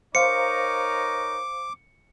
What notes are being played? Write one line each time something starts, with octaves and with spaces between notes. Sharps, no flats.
D#4 A#4 C5 C#5 F5 D6 C#7